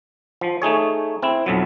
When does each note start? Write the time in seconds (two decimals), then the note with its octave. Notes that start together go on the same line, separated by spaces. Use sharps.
0.41 F3
0.62 A3 D#4 G#4 C#5
1.22 C4 E4
1.46 B1 F2 F#3